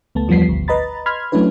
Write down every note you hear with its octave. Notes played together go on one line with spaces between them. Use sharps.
C#2 A3 B3 A5
E2 F3 G3 B3 B6 C7
G#1 D2
B4 D#5 A#5 B5 A6
B5 C6 F6 G#6
F#3 A3 C#4 D4 E4 B4